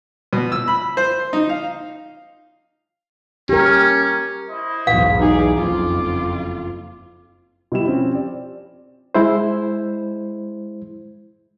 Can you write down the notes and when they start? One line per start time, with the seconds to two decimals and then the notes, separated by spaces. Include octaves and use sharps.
0.33 B2
0.52 E6
0.68 B5
0.97 C5
1.33 D#4
1.49 F5
3.49 C#4 G4 A#4
4.50 E4 C5 D#5
4.87 B1 E2 G#2 F5
5.18 D#4 G#4 D6
5.56 F#1 F2 F4
7.72 B2 G3 E4 E7
7.88 F3 C4 C#4
8.12 G4 D5
9.15 G#3 E4 C5